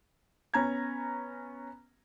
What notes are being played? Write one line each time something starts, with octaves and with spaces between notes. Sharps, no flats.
B3 C#4 A#5 G#6